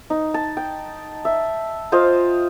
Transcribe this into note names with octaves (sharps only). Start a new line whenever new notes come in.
D#4
A5
G5
E5
F4 C5 D#5 F5